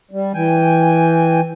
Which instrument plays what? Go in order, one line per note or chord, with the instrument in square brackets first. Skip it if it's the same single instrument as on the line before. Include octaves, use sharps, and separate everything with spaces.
[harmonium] G3
E3 G5 G#5